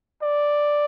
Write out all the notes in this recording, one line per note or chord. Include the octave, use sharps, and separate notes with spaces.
D5